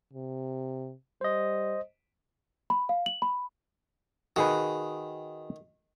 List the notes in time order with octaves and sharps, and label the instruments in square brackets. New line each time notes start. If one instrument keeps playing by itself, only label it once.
[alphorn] C3
[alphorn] G3 [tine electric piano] C5 D#5
[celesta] B5
F5
F#7
B5
[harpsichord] D#3 [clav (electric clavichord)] F#4 G#4 B4